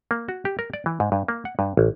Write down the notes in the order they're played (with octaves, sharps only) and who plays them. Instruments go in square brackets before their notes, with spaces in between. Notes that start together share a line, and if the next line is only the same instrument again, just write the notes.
[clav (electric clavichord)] A#3
F#4
G4
A#4
D5
E3
G#2
G2
A#3
F#5
G2
A1